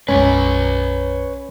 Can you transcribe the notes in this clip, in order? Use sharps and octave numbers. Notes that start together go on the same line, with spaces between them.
B1 F#2 G#3 C#4 B4 C#5